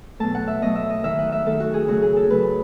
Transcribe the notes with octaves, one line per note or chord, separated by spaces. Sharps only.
B2 F#3 A3 A5
F#5
E5
B2 F#3 A3 D#5
E5
D#5
D#3 A3 E5
F#5
E5
D#3 A3 A4
F#4
G#4
C#3 F#3 A3 F#4
G#4
A4
C#3 F#3 A3 B4